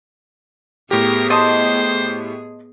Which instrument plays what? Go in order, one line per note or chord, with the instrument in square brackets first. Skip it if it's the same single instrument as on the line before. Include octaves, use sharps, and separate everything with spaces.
[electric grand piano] A2 G4 [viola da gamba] B3 G#4 [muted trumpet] A#4
[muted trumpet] C5 [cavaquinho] D#5 A5 C6